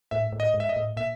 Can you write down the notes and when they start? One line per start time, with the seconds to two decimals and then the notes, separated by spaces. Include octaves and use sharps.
0.11 A2 E5
0.32 A2
0.40 D#5
0.54 G#2
0.60 E5
0.69 D#5
0.76 A2
0.97 A#2 E5